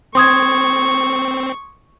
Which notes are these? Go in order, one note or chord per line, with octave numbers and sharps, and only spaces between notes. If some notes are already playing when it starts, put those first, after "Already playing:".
C4 C6 C#6 D#6 G#6